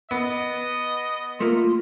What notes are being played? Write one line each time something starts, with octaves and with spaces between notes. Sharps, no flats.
B3 D#5
A3 A#3 F4